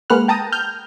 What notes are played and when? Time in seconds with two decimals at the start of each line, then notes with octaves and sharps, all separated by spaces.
0.10 G#3 A#3 B4 F#5 F6 F#6
0.28 G5 A5 A#5 D#6
0.52 F6 G6